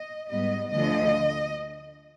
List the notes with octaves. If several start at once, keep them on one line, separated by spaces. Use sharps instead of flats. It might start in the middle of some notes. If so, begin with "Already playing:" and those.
Already playing: D#5
G#2 G3 B3 D#5
D2 D3 F3 D#5